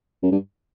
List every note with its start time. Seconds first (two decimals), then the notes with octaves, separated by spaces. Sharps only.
0.23 F#2
0.32 G2